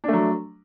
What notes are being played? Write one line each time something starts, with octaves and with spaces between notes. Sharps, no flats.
F#3 A3 D4